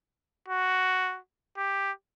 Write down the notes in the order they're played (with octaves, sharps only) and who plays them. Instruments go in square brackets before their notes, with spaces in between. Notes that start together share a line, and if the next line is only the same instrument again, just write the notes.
[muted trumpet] F#4
G4